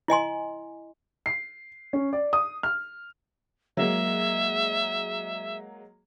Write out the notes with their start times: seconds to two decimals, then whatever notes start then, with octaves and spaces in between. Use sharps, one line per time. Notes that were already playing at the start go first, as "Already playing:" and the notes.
0.08 E4 D#5 G#5 C6
1.26 C7
1.93 C#4
2.13 D5
2.33 D#6
2.63 F6
3.77 F#3 G#3 A#3 E5